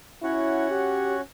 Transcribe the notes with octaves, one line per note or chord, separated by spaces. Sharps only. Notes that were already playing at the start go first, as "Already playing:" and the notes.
C#4 E4 F#4 C#5 F#5
G4